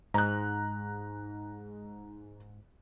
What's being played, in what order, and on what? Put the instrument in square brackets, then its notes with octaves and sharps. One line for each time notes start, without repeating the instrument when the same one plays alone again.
[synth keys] G#2 [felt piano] A#5 F#6